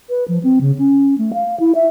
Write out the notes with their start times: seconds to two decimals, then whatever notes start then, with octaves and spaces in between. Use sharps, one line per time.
0.09 B4
0.28 F3
0.43 C4
0.61 C#3
0.79 C#4
1.18 A3
1.34 F5
1.60 E4
1.75 E5